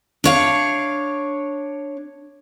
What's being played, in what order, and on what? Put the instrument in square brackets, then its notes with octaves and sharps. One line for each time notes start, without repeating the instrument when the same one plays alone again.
[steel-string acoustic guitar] D4 C#5 F5